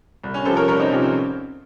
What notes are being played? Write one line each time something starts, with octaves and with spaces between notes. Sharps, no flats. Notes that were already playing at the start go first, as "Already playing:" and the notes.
C2
C#4
C3 F3 A4 C5
A#4 C#5
C2 A#4 C#5
C4 D#4
C3 F3 C#4
C4